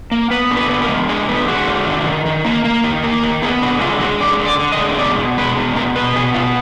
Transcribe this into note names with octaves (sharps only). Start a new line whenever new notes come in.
A#3
B3 B4
D3
B4
B3
A#4
G#3
D3 G#4
B3
G#3 F#4
D3
D#3
D#3
D#3
A#3
A#3
D#3
A#3
D#3
B3 G#4
D3 F#4
G#3 F4
G#3 F#4
D3 D5
D3
D5
D3
D#5
G#3
B2 D5
B2
G#3 B4
B2
B2 A#4
B3 B4
B2 G#4
B3 F4